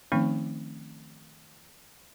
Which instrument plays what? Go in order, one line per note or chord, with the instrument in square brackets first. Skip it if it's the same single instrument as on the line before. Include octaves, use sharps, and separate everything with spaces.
[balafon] D#3 F3 A3 C4 C#4 D#4